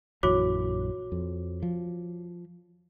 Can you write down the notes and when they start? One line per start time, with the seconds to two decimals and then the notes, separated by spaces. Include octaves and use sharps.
0.23 A#1 F#2 E3 F#4 C#5 D6
1.12 F2
1.62 F3